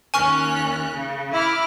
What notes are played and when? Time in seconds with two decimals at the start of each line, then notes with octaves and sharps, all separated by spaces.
0.14 D#2 C#4 G#5 C#6 F6 F#6
0.93 C#3
1.34 E4 B5 D6 F6